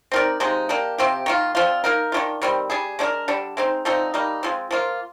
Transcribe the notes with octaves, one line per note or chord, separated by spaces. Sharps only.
C4 D#4 A#4 D5
C3 F3 G#3 D#4
A#3 D4 G4
C3 F3 C4 G4
D#3 A#3 F4
D3 F3 C4 F4
A#3 D#4 A#4
D#3 G#3 D4 F4
D#3 G3 C4
G3 D4 G#4
G#3 D4 G4 A#4
D3 G3 D4
G#3 C4 D#4
D3 F3 C4 D#4
G3 A#3 D#4
F3 G#3 C4
F3 A#3 F4